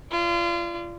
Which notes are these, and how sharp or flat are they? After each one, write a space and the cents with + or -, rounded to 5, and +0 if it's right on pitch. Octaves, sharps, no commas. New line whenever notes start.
F4 -30 D5 +0